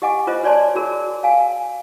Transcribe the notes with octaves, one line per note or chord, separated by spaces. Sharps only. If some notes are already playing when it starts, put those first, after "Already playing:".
G4 D#5 F#5 G#5 D6
F4 B4 C5 D#5
F#4 C#5 D5 G#5 A5 C6
F#4 G#4 A#4
F5 G#5